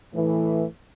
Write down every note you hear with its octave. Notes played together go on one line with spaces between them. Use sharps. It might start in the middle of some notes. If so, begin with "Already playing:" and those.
A2 E3